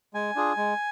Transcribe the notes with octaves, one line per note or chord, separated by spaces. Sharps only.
G#3 G#5
D4 F4 G#4
G#3